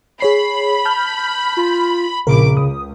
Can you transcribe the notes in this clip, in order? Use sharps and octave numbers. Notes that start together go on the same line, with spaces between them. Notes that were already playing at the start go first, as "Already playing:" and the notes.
G#4 C#5 B5 C7
A5 F6 G6
F4
A#1 C#3 A#4 B5 D6
C#2 D#6